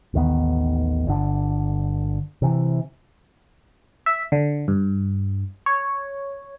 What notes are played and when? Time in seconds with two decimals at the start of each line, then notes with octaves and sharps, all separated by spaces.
0.14 A1 D#2 D#3 B3
1.07 G1 D3
2.42 C3 E3
4.06 E5
4.32 D3
4.68 G2
5.66 C#5